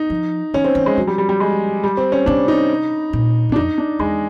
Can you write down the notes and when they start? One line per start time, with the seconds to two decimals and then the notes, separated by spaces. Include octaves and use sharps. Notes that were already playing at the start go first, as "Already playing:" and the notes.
Already playing: D#4
0.10 F3
0.54 E3 C#4
0.64 C4
0.75 E3
0.86 G#3
0.97 F3 F#3
1.07 G3
1.18 G3
1.29 G3
1.40 G#3
1.84 G3
1.97 C4
2.12 C#4
2.26 C3 D4
2.48 D#4
3.13 A#2
3.49 E2
3.52 D4
3.56 F2 D#4
3.78 D4
3.99 E2 G#3